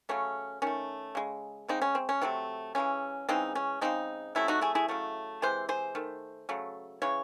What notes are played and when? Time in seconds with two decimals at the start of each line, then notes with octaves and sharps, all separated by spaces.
0.09 C#3 F#3 A3 C#4
0.62 D#3 A3 C#4
1.15 C#3 G#3
1.68 C#3 G#3 C4 D#4
1.82 C#4
1.95 C4
2.09 C#4
2.22 C3 F#3 A3 C4
2.75 C#3 E3 G#3 C#4
3.29 C#3 E3 G#3 C4 D#4
3.55 C#4
3.81 C#3 G#3 C4 D#4
4.35 C3 F#3 A3 C#4 E4
4.48 D#4 F#4
4.61 E4 G#4
4.75 E4 G#4
4.88 C#3 F#3 A3
5.42 C3 E3 G#3 C5
5.69 G#4 C5
5.95 D#3 A3
6.49 C#3 F#3 A3
7.02 C#3 E3 G#3 C#5